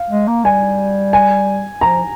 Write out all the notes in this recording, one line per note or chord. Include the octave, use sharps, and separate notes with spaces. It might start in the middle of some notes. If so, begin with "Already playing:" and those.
Already playing: F5
G#3
A#3
G3 G#5
G#5
F3 A#5